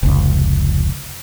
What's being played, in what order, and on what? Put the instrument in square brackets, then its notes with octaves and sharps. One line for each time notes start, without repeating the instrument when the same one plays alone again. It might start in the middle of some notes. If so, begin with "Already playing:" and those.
[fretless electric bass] F1 C#2